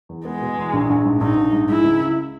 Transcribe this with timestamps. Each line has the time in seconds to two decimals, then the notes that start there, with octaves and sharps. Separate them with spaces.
0.09 E2
0.25 G#3 B3
0.42 B2
0.58 E2
0.73 A#1
0.90 A#1
1.05 G#2
1.21 A#1 D#4
1.37 A#1
1.52 G#2
1.69 G#3 E4
1.84 C#2
2.01 C#2